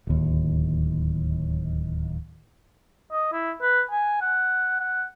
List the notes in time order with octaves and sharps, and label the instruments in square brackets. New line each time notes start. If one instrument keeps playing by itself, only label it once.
[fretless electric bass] D1 D#2
[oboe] D#5
E4
B4
G#5
F#5
F#5